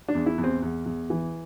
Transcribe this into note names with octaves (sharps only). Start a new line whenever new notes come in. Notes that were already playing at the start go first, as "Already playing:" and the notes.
D4
E2
E4
E2
C4
E2
E2
E3